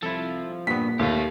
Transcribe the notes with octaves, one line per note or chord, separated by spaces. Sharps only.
C2 F3 E4 A4
G2 A#2 B3 B6
D#2 A3 G4 F5